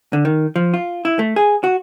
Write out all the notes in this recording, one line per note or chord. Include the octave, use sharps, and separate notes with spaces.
D3
D#3
F3
F4
E4
A3
G#4
F#4